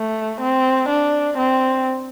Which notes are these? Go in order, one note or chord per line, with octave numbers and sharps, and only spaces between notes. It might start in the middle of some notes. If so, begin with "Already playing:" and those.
Already playing: A3
C4
D4
C4